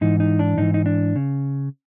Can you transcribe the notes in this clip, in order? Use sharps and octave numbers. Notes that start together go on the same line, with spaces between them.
G#2 E3 D#4
D#4
D4
G#2 E3 D#4
D#4
D4
C#3